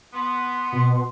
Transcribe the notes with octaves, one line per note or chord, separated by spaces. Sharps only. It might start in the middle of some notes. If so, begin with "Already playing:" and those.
B3 C6
B2